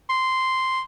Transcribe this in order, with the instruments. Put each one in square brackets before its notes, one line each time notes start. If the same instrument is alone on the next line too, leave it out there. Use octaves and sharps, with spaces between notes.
[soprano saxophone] C6